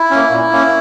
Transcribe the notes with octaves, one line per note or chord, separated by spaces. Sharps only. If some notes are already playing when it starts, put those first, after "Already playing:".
Already playing: E4
A#3 C#4
A#2
A#3 C#4